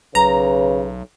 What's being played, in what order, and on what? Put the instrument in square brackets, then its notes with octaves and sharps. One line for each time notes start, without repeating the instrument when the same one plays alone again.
[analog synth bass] B1 [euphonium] C#3 [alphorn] B4 [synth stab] A#5